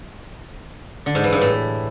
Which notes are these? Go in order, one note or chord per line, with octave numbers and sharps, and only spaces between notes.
D3
G#2
E3
G2
A2